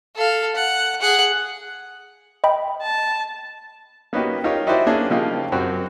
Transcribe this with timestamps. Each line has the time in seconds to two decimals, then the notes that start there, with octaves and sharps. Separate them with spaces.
0.16 A4 F5
0.55 F#5
1.01 G#4 F#5
2.44 D#5 G5 B5
2.81 A5
4.13 A#3 B3 C#4 D#4 F#4 G4
4.44 D#4 F4 G4 A#4 C#5
4.67 D#4 E4 F#4 G4 C5 D5
4.87 A#3 C#4 D4 G#4
5.10 C#3 F3 A#3 D#4 F4 G4
5.52 F#2 C4 F#4 G4